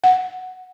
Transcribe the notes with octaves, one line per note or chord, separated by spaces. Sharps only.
F#5